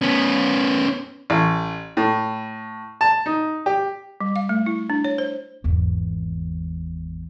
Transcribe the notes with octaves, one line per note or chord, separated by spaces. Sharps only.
B3 C#4
A1
A2
A5
D#4
G4
G3
F5
A3
E4
D4
C#5
C5
G#1 E2